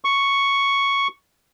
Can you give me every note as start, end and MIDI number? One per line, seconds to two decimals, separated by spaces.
0.05 1.08 85